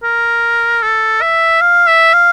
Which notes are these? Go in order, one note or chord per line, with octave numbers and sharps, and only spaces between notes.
A#4
A4
E5
F5
E5
F5